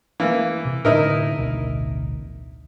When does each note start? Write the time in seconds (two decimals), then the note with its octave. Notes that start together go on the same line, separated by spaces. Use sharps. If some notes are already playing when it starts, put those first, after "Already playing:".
0.20 E3 A#3
0.65 C3
0.85 A2 D3 D#4 E4 A#4
1.37 A1 D2 B2